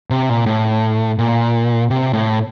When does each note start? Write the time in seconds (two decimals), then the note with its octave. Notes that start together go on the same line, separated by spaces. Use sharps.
0.10 C3
0.29 A#2
0.46 A2
1.19 A#2
1.90 C3
2.13 A2